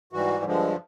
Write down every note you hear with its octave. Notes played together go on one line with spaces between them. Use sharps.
G#2 E3 G3 F#4
G2 D3 F3 G#3